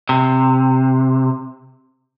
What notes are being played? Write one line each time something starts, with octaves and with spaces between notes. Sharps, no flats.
C3